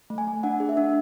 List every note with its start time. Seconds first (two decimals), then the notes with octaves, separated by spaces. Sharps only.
0.10 A3
0.18 G#5
0.27 A3
0.43 D4 F#5
0.60 G#4
0.69 E5
0.77 D4